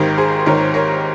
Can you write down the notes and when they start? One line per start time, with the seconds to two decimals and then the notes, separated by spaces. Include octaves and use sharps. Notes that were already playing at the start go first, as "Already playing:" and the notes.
Already playing: G#1 G#2 D#3 G4 A#4
0.18 G#4 C5
0.46 G#1 G#2 D#3 A#4 C#5
0.74 A#4 C#5